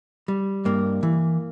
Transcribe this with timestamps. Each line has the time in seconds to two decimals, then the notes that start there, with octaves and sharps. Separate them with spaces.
0.28 G3
0.65 G2 A#3
1.03 E3